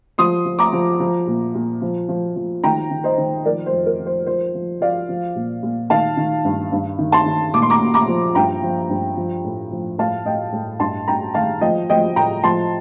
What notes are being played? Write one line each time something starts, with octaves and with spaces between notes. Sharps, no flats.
F3 C6 D#6
F3
A#5 D6
F3
F3
A#2
A#2
F3
F3
F3
D#3 G5 A#5
D#3
C5 D#5
D#3
F3 A#4 D5
C5
F2
A#4
F3
C5
F3 C5
F3
F3 D5 F5
F3
A#2
A#2
D#3 F5 A5
D#3
G2
G2
D#3
A5 C6
D#3
A#2 D6
C6
A#5 D6
A#2
A#5 D6
F3
G2 G5 A#5
F3
G2
F3
A2
F3
A2 F5 A5
A2 D#5 G5
A2
G2 A5 C6
G2 G5 A#5
D#3 F5 A5
F3 D#5 G5
F3 D#5 G5
A2 G5 A#5
F3 A5 C6